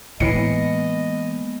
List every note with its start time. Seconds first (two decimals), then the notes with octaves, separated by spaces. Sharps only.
0.20 A2 E3 G#3 A#3 B3 D#5 C#7